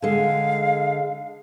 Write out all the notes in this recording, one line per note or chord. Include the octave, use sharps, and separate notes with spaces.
D3 G#3 F5